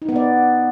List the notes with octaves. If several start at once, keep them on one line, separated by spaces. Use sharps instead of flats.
D#4
B3
D5